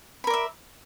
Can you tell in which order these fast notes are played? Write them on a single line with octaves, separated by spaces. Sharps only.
B5 A#4 D5 E5